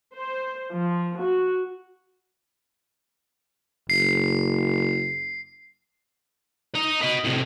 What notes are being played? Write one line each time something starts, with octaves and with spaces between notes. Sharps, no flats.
C5
F3
F#4
F#1 C7
D#5 A#5
B4 D#5
A2 C3